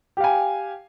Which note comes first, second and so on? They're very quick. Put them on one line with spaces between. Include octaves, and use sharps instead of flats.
G4 F5 G#5